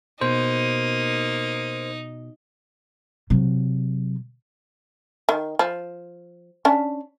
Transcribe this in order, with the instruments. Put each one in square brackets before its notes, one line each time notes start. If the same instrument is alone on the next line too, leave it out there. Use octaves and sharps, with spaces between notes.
[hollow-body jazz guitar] B2 [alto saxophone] A#3 [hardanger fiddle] D#4 [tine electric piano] C5
[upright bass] C3 F#3
[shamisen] D#3
F3
C#4 D4